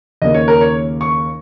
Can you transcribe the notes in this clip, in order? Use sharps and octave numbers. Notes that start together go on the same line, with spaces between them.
D#2 C#3 A#3 D#5
C#5
A#4
C#5
C#6